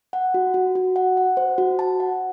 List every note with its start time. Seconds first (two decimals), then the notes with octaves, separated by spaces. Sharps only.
0.13 F#5
0.34 F#4
0.54 F#4
0.75 F#4
0.96 F#5
1.17 F#5
1.37 C5
1.58 F#4
1.79 A5
2.00 F#5